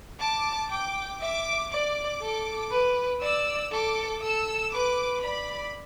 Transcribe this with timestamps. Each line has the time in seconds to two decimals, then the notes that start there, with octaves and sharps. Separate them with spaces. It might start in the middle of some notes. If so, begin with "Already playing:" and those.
0.19 A5 D6
0.70 G5 D6
1.20 E5 D6
1.71 D5 D6
2.22 A4
2.71 B4
3.22 D5 E6
3.72 A4 D6
4.22 A4 E6
4.73 B4 D6
5.23 D5 B5